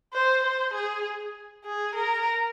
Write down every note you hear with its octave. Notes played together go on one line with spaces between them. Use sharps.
C5
C5
G#4
G#4
A#4